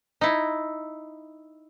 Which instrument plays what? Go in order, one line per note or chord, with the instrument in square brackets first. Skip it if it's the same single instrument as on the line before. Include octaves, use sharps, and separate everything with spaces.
[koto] D#4 E4